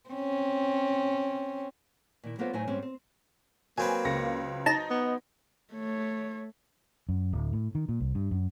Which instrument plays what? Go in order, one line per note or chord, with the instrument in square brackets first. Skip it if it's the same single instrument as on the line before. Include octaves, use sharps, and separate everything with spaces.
[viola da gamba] C4 C#4
[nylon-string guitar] A#2 D#3 E4
F#3 A#3 B3 F4 A4 C5
A2 F#3 D#4 E4 C5 G#5
G#2 G3 C4 C#4
C4
[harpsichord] F#3 C4 B4 [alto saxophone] A#3 [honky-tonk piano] G#5
[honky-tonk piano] C#2 A#6 C#7
[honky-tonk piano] D#4 [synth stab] A5 A#5
[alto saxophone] B3
[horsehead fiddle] A3 C#5
[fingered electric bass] F#2
D1
A2
D#3
A#2
C2
G2
F#2